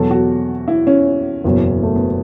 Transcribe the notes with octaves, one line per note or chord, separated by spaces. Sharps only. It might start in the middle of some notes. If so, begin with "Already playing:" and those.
Already playing: E2 B2 F#3 A4
F#4
E4
C#4
F#1 E2 B2 F#3
A3
B3